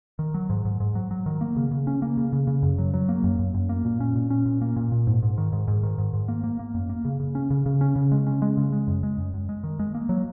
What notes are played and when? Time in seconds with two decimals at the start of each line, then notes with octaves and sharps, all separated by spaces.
0.19 D#3
0.34 F#3
0.50 G#2
0.65 G#2
0.80 G#2
0.95 F#3
1.11 F#3
1.26 D#3
1.41 A#3
1.56 C#3
1.71 C#3
1.87 C#4
2.02 A#3
2.17 C#3
2.33 C#3
2.47 C#3
2.63 F#2
2.78 F#3
2.94 F#3
3.09 A#3
3.24 F#2
3.39 F#2
3.54 F#2
3.69 A#3
3.85 A#2
4.00 C#4
4.16 A#2
4.30 C#4
4.46 A#2
4.61 A#3
4.76 A#2
4.92 A#2
5.07 G#2
5.22 G#2
5.38 D#3
5.53 G#2
5.68 G#2
5.83 D#3
5.98 G#2
6.13 G#2
6.28 A#3
6.44 A#3
6.59 A#3
6.74 F#2
6.89 A#3
7.05 C#3
7.20 C#3
7.35 C#4
7.50 C#3
7.66 C#3
7.81 C#4
7.96 C#3
8.12 G#3
8.27 C#4
8.42 G#3
8.57 C#3
8.72 G#3
8.88 F#2
9.03 G#3
9.18 F#2
9.34 F#2
9.49 G#3
9.64 D#3
9.79 G#3
9.94 A#3
10.09 F#3